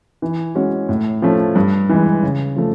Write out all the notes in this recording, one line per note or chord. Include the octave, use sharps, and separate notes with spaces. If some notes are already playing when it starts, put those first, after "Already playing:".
E3
G#3 C#4 F#4
A2
F3 A3 C#4
G2
E3 G#3
C#3
F3 A3